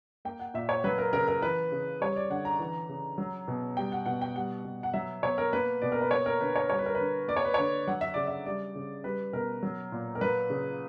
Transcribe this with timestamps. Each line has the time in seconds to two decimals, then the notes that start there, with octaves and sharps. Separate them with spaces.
0.25 A#3 G5
0.39 F#5
0.54 A#2 E5
0.69 C#5
0.84 F#3 B4
0.98 A#4
1.13 C#3 A#4
1.28 A#4
1.42 E3 B4
1.72 C#3
2.01 G3 C#5
2.16 D5
2.30 D3 F#5
2.45 A#5
2.59 E3
2.89 C#3
3.18 F#3
3.48 B2
3.77 G3 G5
3.92 F#5
4.06 B2 F#5
4.21 G5
4.35 G3 F#5
4.65 B2
4.83 F#5
4.94 F#3 E5
5.23 B2 C#5
5.38 A#4
5.53 A#3 B4
5.82 B2 D5
5.92 A#4
6.01 B4
6.11 A#3 C#5
6.26 A#4
6.40 D3 B4
6.55 C#5
6.69 G3 C#5
6.79 B4
6.86 A#4
6.95 D3 B4
7.28 A#3 D5
7.36 C#5
7.45 B4
7.54 D3 C#5
7.87 F#3 F#5
8.01 E5
8.14 C#3 D5
8.27 E5
8.46 G3 D5
8.75 C#3
9.04 G3 B4
9.33 B2 A#4
9.63 F#3
9.92 A#2
10.15 A#4
10.21 F#3 B4
10.50 C#3